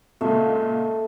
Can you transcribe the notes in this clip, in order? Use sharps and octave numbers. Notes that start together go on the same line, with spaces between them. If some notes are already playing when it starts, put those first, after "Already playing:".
C#2 A#2 A3